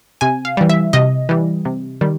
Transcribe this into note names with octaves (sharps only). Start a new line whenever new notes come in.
C3 G#5
F5
E3 G3
E5
C3 D#5
E3 G3
C3
D#3 G3